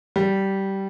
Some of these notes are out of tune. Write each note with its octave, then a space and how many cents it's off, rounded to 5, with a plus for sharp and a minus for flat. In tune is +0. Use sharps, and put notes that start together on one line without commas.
G3 -15